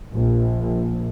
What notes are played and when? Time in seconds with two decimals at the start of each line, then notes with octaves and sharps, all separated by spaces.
0.13 A#1